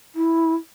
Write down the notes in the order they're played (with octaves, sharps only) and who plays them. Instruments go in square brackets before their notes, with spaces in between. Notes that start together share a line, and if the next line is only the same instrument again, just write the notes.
[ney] E4